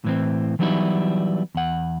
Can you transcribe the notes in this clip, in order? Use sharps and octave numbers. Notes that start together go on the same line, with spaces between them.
A2 E3 C4
E3 F#3 G3 B3 D#4 E4
E2 F#5